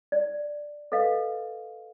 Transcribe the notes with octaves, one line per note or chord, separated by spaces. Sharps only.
D5
A4 B4 D#5 F5